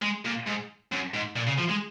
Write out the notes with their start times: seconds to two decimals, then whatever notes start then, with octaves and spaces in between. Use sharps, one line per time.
0.02 G#3
0.25 A#2
0.47 G#2
0.92 F#2
1.14 G#2
1.36 A#2
1.47 C#3
1.58 F3
1.70 G#3